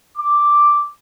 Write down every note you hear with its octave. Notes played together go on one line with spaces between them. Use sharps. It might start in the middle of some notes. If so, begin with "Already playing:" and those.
D6